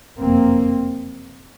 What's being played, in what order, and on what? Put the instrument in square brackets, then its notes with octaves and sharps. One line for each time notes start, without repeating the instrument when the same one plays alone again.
[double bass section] F#1 F2 C3 A#3 C4